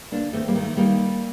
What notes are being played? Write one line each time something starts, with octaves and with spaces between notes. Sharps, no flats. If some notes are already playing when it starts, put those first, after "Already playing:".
D2 A#3 D4
D#2 A3 C4
G3 A#3
D#3
A3
D#3 G3 A#3